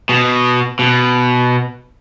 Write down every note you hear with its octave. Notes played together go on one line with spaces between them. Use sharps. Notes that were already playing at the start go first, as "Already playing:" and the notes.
B2
B2